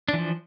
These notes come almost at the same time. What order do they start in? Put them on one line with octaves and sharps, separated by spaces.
D4 E3 F3